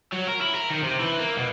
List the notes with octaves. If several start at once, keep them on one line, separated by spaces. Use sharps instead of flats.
F#3
A#4
E4
A#4
D#3
C3
E3
A#3
B2